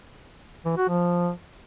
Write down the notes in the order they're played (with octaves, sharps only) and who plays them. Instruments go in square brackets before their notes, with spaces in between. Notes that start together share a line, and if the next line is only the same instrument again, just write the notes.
[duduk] E3
F#4
F3